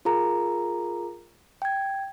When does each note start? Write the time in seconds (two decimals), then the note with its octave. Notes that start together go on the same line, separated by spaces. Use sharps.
0.05 F4 G#4 A#4 A#5
1.62 G5 G#6